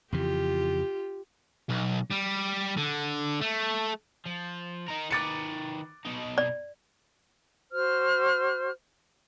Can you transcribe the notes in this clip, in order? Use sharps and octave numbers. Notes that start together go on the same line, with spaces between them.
F2 C#3 E3 F4 G4
B1
G3
D3
A3
F3
D#4 A#4
D#3 B4 D6 A6 C#7
B2 D#4
D5
F#4 C5 F6